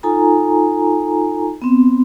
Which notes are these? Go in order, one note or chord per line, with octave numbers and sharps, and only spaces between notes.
D#4 F4 A4 G#5 A#5
B3 C4